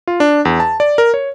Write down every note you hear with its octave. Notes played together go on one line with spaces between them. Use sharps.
F4
D4
E2
A5
D5
A#4
C#5